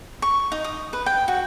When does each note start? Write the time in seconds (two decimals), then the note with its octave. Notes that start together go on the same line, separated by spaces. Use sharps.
0.22 C#6
0.52 D#4
0.64 D#6
0.93 B4
1.06 G5
1.28 F#4